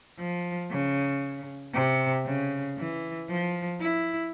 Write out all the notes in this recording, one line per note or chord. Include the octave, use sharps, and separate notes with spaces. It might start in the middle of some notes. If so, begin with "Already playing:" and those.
F3
C#3
C3
C#3
E3
F3
E4